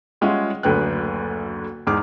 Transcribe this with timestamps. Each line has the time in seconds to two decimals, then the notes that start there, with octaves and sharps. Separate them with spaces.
0.21 G3 G#3 C#4 F4 E5 F#5
0.63 F#1 D2 D3 B3 G5 F#6
1.87 E2 G#2 D#4 G#4 D6 F6